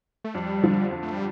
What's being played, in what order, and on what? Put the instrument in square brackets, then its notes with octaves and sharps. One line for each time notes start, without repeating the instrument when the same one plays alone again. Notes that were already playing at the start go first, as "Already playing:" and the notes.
[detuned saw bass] A3
[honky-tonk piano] F2 [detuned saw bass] G3
[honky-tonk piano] D3 F3
F2
[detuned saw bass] A3
G3